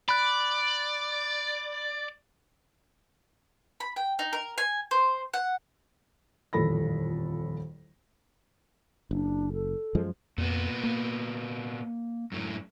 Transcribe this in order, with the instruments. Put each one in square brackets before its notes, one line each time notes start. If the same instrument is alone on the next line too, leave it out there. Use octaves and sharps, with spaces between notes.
[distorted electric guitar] D5 [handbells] B5 F#6
[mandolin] B5
G5
D#4
A#4
G#5
C5
F#5
[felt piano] D#1 A1 F2 A4 B5 A#6
[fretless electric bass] F#1 [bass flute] D4
[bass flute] A4
[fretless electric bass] F#2 F3 G#3
[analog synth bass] F2 [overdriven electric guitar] A#2 B3
[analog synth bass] A#3
[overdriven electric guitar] F#2 A2